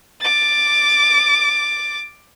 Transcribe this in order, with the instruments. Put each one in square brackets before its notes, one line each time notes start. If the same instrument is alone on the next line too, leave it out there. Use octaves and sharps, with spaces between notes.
[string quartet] D6 A6